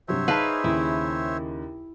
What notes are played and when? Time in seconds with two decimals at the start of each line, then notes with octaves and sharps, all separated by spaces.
0.08 G2 C3 F#3 C5 C#5 E5
0.28 D#4 G#4 B4 F5 A5
0.64 D#2 C#3 E4